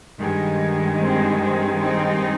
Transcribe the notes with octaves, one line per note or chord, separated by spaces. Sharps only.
G2 D#3 G#3
C4
C4
C4 D#4